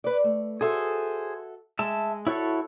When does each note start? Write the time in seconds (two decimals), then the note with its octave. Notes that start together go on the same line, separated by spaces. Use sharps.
0.04 B4 D5
0.24 A3
0.61 F#4 G#4 A4 C5 E5
1.79 G#3 E5 A5
2.27 E4 F#4 A4 C#5